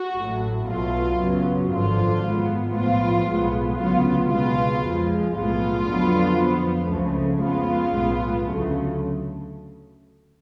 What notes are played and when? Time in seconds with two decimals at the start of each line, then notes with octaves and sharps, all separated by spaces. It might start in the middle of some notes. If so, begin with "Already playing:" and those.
Already playing: F#4
0.17 A1 A2 F#3 A3
0.68 B1 B2 F#3 A3 F4
1.20 F#2 C#3 F#3 B3
1.72 G#1 F#2 D3 F3 F4
2.23 G#2 G#3 B3
2.75 B1 A2 F3 B3 F4
3.27 B1 A2 G#3 B3
3.79 D2 C#3 F#3 B3 F4
4.31 C#2 B2 G#3 B3 F4
4.82 F2 F3 G#3
5.34 B1 A2 G#3 B3 F4
5.86 F2 D3 F#3 B3
6.38 F2 F3 B3
6.90 C#2 C#3 F3 A3
7.42 F2 C#3 G#3 B3 F4
7.93 B1 A2 G#3 B3
8.45 D2 C#3 F#3 A3